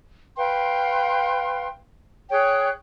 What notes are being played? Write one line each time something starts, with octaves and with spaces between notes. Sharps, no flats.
B4 F5 G5 C6
G#4 C#5 G5 F#6